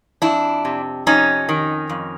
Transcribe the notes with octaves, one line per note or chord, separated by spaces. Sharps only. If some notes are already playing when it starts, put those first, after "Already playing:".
F2 D4 E4
C3
F2 C#4 D#4
D#3
F2